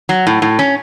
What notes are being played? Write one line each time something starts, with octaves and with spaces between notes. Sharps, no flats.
F#3
A2
A2
C#4